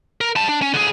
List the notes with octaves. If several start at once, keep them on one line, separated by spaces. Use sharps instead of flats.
A#4
G3 A5
D4
C#4
D3 G#4